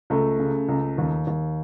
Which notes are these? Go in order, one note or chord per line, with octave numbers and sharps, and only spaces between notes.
C#2 A3
C#3
C#2
D#2
D#2